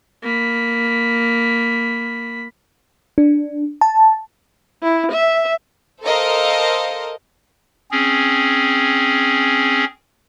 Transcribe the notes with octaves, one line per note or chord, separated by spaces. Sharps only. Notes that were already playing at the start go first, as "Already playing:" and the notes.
A#3 B5
D4
A5
E4
E5
A4 A#4 C5 D#5 F5
C4 C#4 G#4